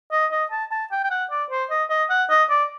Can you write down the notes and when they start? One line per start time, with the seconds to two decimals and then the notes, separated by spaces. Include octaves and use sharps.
0.12 D#5
0.32 D#5
0.51 A5
0.72 A5
0.92 G5
1.04 G5
1.11 F#5
1.31 D5
1.50 C5
1.70 D#5
1.90 D#5
2.10 F#5
2.30 D#5
2.50 D5